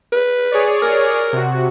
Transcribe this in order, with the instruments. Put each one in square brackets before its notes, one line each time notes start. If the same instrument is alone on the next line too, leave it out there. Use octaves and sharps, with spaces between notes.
[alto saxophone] B4
[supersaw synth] G#4 C#5 D5
[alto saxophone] A#4
[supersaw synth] C3 F#4